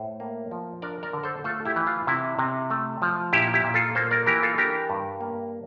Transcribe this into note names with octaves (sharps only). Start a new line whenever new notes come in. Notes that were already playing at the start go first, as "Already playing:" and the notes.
Already playing: A2 A4 C5
A#3
F3
D4 A#4 D5
A#4 D5
D3
A4 C5
A3 F4 A4
E4 G4
E3
F4
C3 E4
C3
A3
F3
A#2 E4 G4
E4 G4
A#2
F4 A4
A#3 A4 C5
A#4 D5
E3 G4 A#4
F4 A4
D4 G4 A#4
G2
A#3